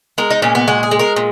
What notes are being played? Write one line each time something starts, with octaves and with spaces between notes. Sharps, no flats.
G#3 A#4
D#4
A#2 C#4
B3
G#3 F#4
G#4
G#3
A#4
A#2